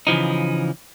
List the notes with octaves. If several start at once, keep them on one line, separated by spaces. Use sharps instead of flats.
C#3 E3 F3 D#4